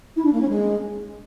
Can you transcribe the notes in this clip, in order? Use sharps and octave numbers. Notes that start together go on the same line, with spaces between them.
E4
D4
A#3
C#4
G#3